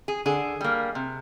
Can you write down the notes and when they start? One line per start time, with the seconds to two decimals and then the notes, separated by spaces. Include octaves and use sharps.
0.08 G#4
0.26 D3 G#4
0.61 G3 A#3
0.95 C3